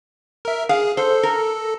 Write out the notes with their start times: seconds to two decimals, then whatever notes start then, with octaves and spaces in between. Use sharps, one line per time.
0.45 A#4 E5
0.69 G#4 F5
0.97 A4 C5
1.23 A#4